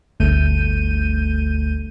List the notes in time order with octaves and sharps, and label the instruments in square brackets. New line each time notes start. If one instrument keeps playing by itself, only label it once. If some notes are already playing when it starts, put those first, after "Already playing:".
[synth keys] G1 D2 A3 G6 D#7